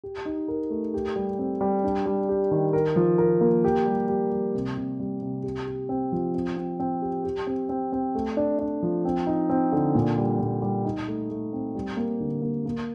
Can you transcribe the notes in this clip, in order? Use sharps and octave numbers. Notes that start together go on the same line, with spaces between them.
G4
D#4
A#4
A3
G4
G3
C4
G3
D4
G3
G4
D#3
A#4
F3
A#4
A#3
G4
G3
G3
G3
C3
C3
G3
C3
G4
G4
C4
F3
C4
C4
C4
G4
G4
C4
C4
C4
A3
D4
D4
F3
C4
D#4
C4
D3
A#2
G3
A#2
G3
D#4
A3
A3
C4
G3
A#3
D3
A#3
A#3